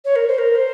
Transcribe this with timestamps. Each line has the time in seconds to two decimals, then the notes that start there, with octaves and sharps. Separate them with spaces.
0.05 C#5
0.16 A#4
0.27 C5
0.38 A#4
0.55 C5